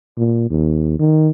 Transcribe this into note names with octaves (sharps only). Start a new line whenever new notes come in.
A#2
D#2
D#3